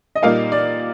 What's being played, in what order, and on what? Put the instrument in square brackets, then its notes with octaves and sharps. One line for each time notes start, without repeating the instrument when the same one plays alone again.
[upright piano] D#5
A#2 G3 A#3 D#4 F5
D5